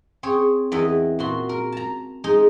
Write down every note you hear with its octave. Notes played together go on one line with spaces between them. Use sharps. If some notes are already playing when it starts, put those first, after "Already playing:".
C4 G#4 C#5
E2 E3 D#5
A#2 F#4 C6
A#4
A5 A#5
G#3 D#4